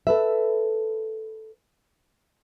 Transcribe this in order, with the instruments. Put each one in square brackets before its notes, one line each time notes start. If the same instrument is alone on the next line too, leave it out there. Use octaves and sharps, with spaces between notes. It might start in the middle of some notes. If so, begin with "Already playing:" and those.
[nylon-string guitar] A4 B4 E5